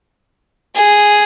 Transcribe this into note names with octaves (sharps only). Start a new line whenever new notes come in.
G#4